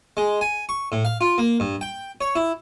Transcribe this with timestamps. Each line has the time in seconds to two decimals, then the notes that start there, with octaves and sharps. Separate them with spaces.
0.17 G#3
0.41 G#5
0.69 C#6
0.92 A2
1.05 F5
1.21 F4
1.38 A#3
1.60 G2
1.81 G5
2.21 C#5
2.36 E4